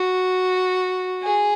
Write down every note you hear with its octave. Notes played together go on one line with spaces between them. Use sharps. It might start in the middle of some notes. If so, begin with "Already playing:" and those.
Already playing: F#4
G#4